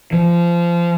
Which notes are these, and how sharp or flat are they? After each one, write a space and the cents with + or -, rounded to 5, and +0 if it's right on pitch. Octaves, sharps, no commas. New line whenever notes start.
F3 -25